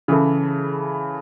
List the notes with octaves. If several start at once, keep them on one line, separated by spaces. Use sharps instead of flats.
C#3 E3 E4 A4